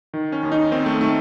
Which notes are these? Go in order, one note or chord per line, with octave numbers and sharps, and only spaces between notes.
D#3
C#4
D#2
D#4
D#3 C4
A3
D#3 A3